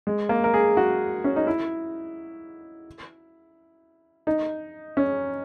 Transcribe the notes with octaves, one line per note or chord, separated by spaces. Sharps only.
G#3
A#3
A#4
G#4
F#4
C#4
D#4
E4
D#4
C#4